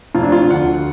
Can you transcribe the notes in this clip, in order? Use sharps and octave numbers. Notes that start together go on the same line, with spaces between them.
F1 F4
D4
F3 F4
D2 F#5
D2